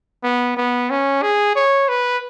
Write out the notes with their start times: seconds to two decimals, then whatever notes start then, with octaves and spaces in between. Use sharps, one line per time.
0.23 B3
0.57 B3
0.90 C#4
1.22 G#4
1.56 C#5
1.89 B4